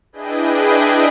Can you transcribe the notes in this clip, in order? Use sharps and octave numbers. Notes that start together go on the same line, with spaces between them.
D4 E4 G#4 B4 D#5 G5